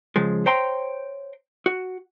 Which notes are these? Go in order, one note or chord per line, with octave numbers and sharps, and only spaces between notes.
C#3 F3 G#3
C5 C#5 G5 A#5 C6
F#4